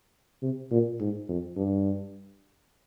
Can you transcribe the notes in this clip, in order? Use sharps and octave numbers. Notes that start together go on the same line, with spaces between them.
C3
A#2
G#2
F2
G2